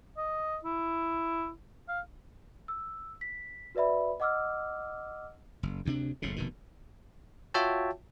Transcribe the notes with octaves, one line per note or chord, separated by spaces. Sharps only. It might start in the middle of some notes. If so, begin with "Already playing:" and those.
D#5
E4
F5
E6
B6
F#4 B4 D5 E5 B5
D#5 F#5 D6 E6 F6
F#1
D2 C3 D4
F#1 F2 A2 C#3
F1 B2 D#3
F4 F#4 C#5 E5 G5 A5